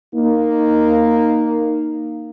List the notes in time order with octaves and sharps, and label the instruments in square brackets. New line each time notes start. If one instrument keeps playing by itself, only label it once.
[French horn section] A#3 D#4